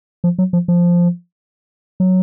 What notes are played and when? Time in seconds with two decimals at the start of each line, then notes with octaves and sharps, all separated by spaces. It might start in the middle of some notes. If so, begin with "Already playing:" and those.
0.24 F3
0.39 F#3
0.53 F3
0.68 F3
2.00 F#3